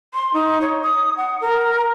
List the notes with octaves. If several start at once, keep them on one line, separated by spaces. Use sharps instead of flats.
C6
D#4
C#5
D#6
F#5
A#4